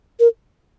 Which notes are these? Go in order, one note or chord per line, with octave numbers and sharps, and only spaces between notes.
A#4